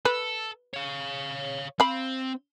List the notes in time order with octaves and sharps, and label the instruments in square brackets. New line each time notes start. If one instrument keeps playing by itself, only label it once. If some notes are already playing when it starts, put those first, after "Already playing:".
[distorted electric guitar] A4 [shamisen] B4
[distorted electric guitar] C#5 F5
[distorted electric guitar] C4 [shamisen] F5 B5